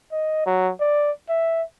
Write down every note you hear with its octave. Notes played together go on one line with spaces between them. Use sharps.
D#5
F#3
D5
E5